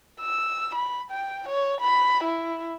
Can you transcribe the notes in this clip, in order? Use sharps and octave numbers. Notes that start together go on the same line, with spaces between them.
E6
B5
G5
C#5
B5
E4